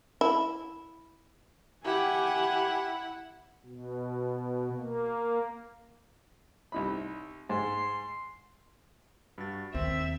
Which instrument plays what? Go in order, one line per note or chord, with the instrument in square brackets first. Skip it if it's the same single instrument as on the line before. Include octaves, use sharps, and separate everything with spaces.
[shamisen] E4
[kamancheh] E4 F#5 [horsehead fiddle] G4 G#5
[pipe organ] B2
A#3
[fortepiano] C2 D#4 B5
[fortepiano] G#2 [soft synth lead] C6
[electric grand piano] G2 F#4 A6
[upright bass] D#2 [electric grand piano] C4 [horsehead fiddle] E5